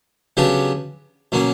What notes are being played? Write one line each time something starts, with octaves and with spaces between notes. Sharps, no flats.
C#3 F#3 B3 D4 G4
B2 F#3 A#3 C#4